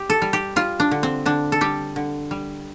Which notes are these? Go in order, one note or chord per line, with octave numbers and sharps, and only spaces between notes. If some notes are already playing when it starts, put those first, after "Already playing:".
Already playing: G4
A4
G3
G4
G3 F4
D4
D3
C4
D3 D4
A4
G3 G4
D3
G3